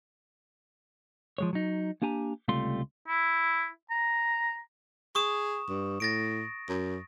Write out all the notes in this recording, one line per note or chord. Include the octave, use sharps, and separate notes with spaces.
F3 G#3 C#5
F#3 D#4
A#3 D4 G4 G#5 A#5
C#2 C3 G3 A3 F4 C6
E4
A#5
G#4 C#6 D#6 E7
G2
A2 A6 A#6 D7
F#2